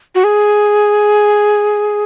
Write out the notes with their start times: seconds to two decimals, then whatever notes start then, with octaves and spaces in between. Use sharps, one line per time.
0.15 F#4
0.24 G#4